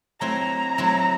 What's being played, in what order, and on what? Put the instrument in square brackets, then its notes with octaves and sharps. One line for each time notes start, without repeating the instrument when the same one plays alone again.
[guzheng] F#3 A3 C4 E4 [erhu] A#5
[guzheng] F#3 A3 C4 E4